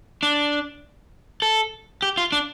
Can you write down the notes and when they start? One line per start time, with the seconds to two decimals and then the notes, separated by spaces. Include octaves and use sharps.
0.23 D4
1.42 A4
2.02 G4
2.17 F4
2.32 D4